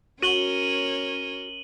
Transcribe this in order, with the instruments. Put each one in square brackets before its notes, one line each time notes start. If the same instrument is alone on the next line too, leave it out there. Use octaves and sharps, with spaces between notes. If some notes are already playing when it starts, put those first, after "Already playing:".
[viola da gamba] C#4 A#4 C#5 [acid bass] F#4 [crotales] D#7 F#7 G7